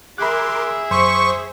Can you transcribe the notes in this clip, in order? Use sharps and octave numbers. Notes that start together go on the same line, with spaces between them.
G#4 A#4 E5 B5 C6 D6 F#6
F#2 C5 C6 C#6 D#6 B6